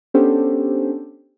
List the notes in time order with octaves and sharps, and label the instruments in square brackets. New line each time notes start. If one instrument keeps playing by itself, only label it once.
[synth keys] B3 C#4 D4 G4 A4 C5